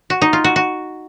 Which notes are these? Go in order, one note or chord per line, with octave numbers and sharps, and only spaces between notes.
F#4
D#4
F4
F#4
F#4